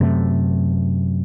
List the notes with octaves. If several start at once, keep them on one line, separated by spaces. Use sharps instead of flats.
F#2 C3 A3